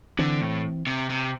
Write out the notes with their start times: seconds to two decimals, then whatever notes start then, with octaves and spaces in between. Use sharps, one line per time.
0.19 D3 E3 C4
0.41 A2
0.87 C3
1.10 C3